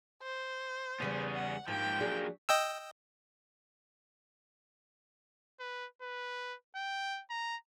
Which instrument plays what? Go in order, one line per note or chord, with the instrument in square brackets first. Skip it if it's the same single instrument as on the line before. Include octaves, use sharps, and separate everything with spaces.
[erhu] C5
[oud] E2 C#3 G3 [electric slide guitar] B3 C#4 G#4
[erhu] F#5
[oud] G#2 [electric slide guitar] F3 A#3 G4 [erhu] G5
[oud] F#3 D4 G#4
[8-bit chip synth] D#5 G5 E6
[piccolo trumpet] B4
B4
G5
A#5